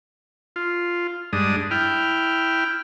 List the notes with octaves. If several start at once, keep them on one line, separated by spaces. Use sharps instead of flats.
F4
G2 G#3 D4 D#6
E4 G5 F6